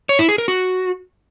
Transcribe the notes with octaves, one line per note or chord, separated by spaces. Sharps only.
C#5
E4
G#4
A#4
F#4